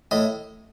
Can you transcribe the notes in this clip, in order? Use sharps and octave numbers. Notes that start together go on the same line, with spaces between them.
A2 D#5